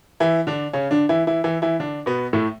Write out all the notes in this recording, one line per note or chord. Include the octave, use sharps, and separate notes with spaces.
E3 E4
D3 D4
C#3 C#4
D3 D4
E3 E4
E3 E4
E3 E4
E3 E4
D3 D4
B2 B3
A2 A3